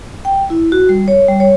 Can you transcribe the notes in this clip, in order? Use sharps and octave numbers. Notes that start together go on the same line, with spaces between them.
G5
E4
F#4
G3
C#5
G3
C#5